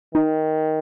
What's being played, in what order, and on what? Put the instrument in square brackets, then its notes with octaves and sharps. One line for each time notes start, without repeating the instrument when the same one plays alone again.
[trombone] D#3 [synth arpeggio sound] D#4